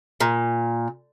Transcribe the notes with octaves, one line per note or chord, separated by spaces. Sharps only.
A#2